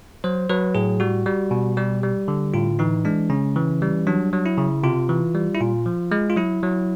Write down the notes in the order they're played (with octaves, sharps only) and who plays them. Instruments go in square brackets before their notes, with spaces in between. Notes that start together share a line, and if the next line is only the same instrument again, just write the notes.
[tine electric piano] F#3 C5
F#3 B4
A2 G#4
G3 F#4
G3
B2
G3 G4
G3
D3
A2 F4
E3 D#4
G#3 D4
C#3 C#4
E3
G3
F#3 D4
F#3
E4
C#3
C3 F4
E3
G3
E4
A#2 F4
F3
G#3
F4
F#3 E4
F#3